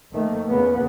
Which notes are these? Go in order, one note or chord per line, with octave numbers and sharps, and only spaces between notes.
F2 D#3 A3 A#3
E2 C#3 A#3 B3